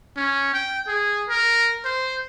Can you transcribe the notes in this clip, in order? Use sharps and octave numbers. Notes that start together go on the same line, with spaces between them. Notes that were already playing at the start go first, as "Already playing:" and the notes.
C#4
G5
G#4
A#4
C5